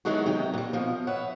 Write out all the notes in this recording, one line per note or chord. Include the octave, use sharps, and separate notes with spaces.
D#3 E3 F#3 G#3 D#4 F#4
C3 F#3 D#5 G5
A#2 G3
B2 F3
B4 C#5 E5 F#5